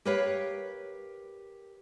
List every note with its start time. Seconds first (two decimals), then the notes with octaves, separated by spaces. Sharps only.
0.05 G4 A#4 B4 C#5 F5